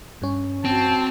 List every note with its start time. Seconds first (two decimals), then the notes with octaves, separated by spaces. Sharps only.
0.22 G2 C#4
0.65 C4 F#4 A5